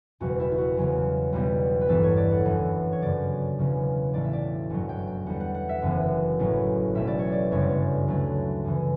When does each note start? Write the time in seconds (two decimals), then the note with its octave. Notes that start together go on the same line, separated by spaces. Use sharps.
0.20 F#1 E2 B2 G3 F#4
0.40 E4
0.51 E4
0.58 F#4
0.77 E1 E2 C#3 F#3
1.33 B1 B2 G3 B3
1.81 B4
1.88 A1 G2 E3 B3 A4
2.04 C#5
2.17 D5
2.31 F#5
2.45 G1 F#2 E3
2.92 C#5
3.01 G1 F#2 C#3 F#3 D5
3.58 E1 E2 C#3 F#3
4.13 B1 A2 E3 A3 D5
4.24 E5
4.33 D5
4.70 G1 F#2 D3 F#3 F#5
4.89 G5
5.07 G5
5.26 E2 D3 G3 B3 F#5
5.40 F#5
5.54 F#5
5.69 E5
5.82 F#1 F#2 E3 B3
6.39 A1 A2 F#3 B3
6.95 B1 B2 A3 E5
7.07 D5
7.19 C#5
7.32 D5
7.51 G1 F#2 C#3 G3 C#5
7.60 D5
7.69 C#5
8.07 D2 D3 F#3 A3
8.64 F#2 C#3 E3